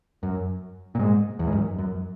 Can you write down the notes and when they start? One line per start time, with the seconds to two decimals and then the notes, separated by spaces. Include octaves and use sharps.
0.23 F#2
0.95 A#2
1.00 G#2
1.39 E2
1.47 G#2
1.53 F#2
1.78 F#2